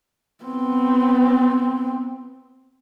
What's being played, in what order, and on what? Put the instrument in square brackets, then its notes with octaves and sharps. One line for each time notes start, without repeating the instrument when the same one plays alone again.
[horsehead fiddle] B3 C4